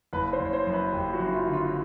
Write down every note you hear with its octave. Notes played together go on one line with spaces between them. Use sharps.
F#1 B4
C5
F#1
C#5
C5
F#2
B4
F#1 G4
F#4
F#2
E4
F4
D3
F4